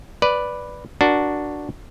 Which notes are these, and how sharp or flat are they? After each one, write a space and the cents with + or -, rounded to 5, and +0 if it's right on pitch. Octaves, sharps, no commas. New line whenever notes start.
B4 +0 D5 +0
D4 +0 F#4 +0 A#4 +5